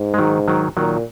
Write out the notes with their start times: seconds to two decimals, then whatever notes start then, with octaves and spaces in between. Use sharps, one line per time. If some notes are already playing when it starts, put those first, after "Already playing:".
Already playing: G#2
0.14 G#3
0.18 D#3 F#3
0.48 D#3 F#3
0.77 A#2 D#3 F#3